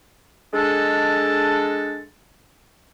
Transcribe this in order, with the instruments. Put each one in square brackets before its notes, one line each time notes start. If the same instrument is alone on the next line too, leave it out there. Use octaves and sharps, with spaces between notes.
[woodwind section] G#3 D4 A4